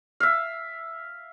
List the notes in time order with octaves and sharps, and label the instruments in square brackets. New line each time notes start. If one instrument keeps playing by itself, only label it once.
[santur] E5 F5